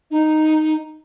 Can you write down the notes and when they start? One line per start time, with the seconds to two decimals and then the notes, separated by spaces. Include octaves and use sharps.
0.10 D#4